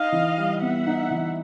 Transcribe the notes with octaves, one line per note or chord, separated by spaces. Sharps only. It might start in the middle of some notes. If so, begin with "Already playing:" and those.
Already playing: D#4 D#5 F5
E3
G3
B3 E5 F#5
D#4
E3